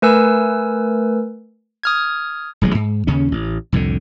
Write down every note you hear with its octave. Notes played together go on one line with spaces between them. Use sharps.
A3 A#4 B4 G#5 E6
D#6 F6 G#6
D#1 A1 F#3 G#3
G#2
D#2 C#3 C#4
A1
C2 F2 A2 D3